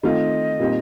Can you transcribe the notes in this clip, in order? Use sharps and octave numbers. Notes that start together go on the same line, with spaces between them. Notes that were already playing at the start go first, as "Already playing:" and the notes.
D#3 A3 C4 F4 D#5
A#2 G3 C4 D#4